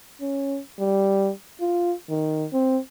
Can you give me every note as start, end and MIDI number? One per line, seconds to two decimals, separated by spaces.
0.21 0.59 61
0.79 1.31 55
1.61 1.93 65
2.09 2.45 51
2.53 2.78 60